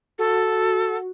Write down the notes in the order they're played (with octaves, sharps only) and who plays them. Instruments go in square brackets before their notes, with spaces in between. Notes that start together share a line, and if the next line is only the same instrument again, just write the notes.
[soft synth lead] F#4 [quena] A4